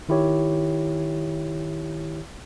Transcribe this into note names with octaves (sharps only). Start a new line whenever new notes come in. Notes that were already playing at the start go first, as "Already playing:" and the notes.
D#3 E4 G4 C#5